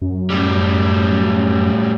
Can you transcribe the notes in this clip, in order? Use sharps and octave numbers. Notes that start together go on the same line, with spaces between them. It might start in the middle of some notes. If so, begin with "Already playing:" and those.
F#2
A2 G3